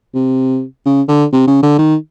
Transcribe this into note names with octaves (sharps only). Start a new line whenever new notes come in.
C3
C#3
D3
C3
C#3
D3
D#3